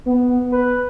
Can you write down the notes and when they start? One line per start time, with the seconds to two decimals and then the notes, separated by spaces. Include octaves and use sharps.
0.06 B3
0.52 B4